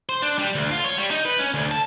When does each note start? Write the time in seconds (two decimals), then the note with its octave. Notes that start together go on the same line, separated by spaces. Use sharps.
0.09 C5
0.22 D4
0.38 G3
0.55 D2
0.71 F4
0.84 C#5
0.97 G3
1.11 D#4
1.25 B4
1.39 C#4
1.54 D2
1.71 A5